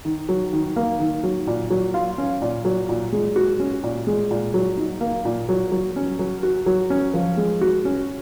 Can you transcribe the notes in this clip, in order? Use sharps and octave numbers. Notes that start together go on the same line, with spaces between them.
D#3
F#3
D#3
A#3
D#3
F#3
A#2
F#3
F4
C#4
A#2
F#3
A#2
G#3
F#4
C#4
A#2
G#3
A#2
F#3
D#4
A#3
A#2
F#3
F#3
C#4
F#3
F#4
F#3
C#4
F3
G#3
F#4
C#4